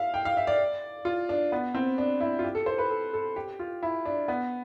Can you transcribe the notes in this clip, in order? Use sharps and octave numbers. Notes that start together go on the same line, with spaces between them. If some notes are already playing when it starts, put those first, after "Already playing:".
Already playing: E5 F5
G5
F5
E5
D5
F4
D4
B3
C4
D4
E4
F4
G4
A4
C5
B4
A4
A4
G4
F4
E4
D4
B3